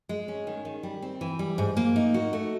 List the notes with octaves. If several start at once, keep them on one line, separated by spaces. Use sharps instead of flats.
G#3
C#4
D#3
D#3
G3
C4
E3
G3
G#2
A#3
D#4
F#4
A3